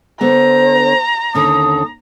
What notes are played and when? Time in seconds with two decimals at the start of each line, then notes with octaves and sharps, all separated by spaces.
0.21 D3 B3 C5 A#5
1.34 D#2 D3 C#4 D#6